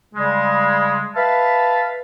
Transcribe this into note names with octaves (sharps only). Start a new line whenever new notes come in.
C#3 G3 G#3
B4 E5 F5 A5 B5